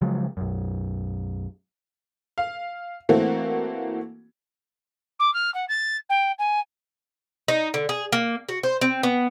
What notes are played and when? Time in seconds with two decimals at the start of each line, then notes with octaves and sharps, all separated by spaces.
0.01 C#3 F3 F#3 G#3
0.37 B1 F#2
2.38 F5
3.09 E3 A3 A#3 C4 F#4
5.19 D6
5.33 F6
5.54 F#5
5.68 A6
6.09 G5
6.38 G#5
7.48 D#4
7.74 D3
7.89 G#4
8.13 A#3
8.49 F#4
8.63 C5
8.81 C4
9.03 B3